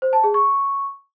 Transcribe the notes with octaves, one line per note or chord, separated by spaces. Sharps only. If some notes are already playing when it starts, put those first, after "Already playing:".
C5
A5
G#4
C#6